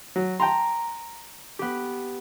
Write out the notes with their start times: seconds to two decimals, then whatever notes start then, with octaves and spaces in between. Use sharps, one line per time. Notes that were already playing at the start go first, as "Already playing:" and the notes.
0.16 F#3
0.40 G5 A5 A#5 C6
1.59 B3 G4